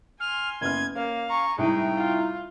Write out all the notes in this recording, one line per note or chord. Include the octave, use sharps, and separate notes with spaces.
G#5 C6 F6
F#1 B3 F6 G#6
A#3 C#4 F5
G#5 A#5 C#6
A2 C3 G3 G#3 D#4 G5 G#5
F4